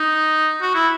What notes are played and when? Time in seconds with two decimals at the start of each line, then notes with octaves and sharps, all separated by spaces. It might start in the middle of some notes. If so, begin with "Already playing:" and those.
Already playing: D#4
0.62 F#4
0.75 E4